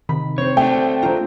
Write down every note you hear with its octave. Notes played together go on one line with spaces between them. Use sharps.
C3 D#3 B5
C4 C5 C#5
A3 D4 G5
C4 F4 A#5